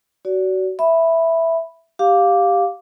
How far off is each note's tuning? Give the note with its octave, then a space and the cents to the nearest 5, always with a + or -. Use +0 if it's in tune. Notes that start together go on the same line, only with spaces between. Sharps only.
F#4 +25 D5 -30
E5 +0 B5 +0
G4 +5 F5 +10 D6 -5